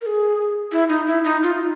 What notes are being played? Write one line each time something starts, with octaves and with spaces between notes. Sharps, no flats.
A#4
G#4
E4
D#4
E4
D#4
F4